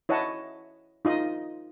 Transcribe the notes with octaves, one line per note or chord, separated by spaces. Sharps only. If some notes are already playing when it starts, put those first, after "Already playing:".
E4 C#5 D#5 F#5 A5
D#4 F4 D#5